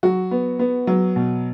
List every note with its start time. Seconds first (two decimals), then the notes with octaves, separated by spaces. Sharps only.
0.03 F#3 F#4
0.31 B3
0.59 B3
0.87 F#3
1.16 B2